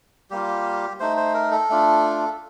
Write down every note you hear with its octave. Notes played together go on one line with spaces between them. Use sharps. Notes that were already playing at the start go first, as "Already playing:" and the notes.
G3 A#3 F4 G4
A3 D#4 C5
C5
A#4
A4
A3 D4 F4